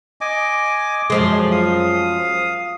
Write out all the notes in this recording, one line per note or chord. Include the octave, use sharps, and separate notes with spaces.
D#5 G#5 D6
F#2 F3 G#3 C6
F5 D#6